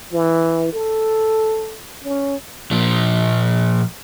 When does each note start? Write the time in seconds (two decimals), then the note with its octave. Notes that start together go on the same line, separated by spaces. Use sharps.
0.12 E3
0.73 A4
2.04 C#4
2.71 A#2 F3